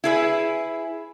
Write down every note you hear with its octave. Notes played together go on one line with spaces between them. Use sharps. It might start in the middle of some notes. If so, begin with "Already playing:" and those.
E4 G#4 B4